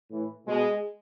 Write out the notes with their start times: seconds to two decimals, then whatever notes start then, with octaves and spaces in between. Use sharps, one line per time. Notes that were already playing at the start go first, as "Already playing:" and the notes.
0.10 A2 E3
0.46 B2 G#3